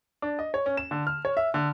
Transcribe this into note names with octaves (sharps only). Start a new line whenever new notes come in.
D4
D#5
C#5
C#4
E7
D3
F6
C#5
E5
D3